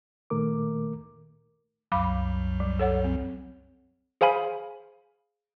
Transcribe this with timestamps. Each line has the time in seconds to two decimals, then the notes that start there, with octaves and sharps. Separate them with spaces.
0.30 A#2 D#3 A3 A#4 D6
1.92 C2 F#2 F#3 F5 B5 D6
2.60 G3
2.79 A4 C#5 F#5
3.04 C4
4.21 G#4 C5 F5 G#5 B5